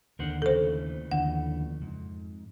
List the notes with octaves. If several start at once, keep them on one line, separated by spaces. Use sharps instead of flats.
D#2 D3 A#4 C5 F#5
C#3 E3 A3 A4 C5
D#2 D3 F3 F#5
F2 G#2